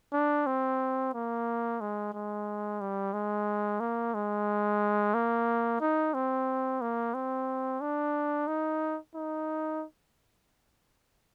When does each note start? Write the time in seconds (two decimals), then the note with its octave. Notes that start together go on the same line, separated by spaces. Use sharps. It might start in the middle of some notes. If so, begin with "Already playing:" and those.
0.13 D4
0.47 C4
1.14 A#3
1.81 G#3
2.13 G#3
2.81 G3
3.13 G#3
3.80 A#3
4.14 G#3
5.14 A#3
5.80 D#4
6.14 C4
6.81 A#3
7.14 C4
7.81 D4
8.47 D#4
9.15 D#4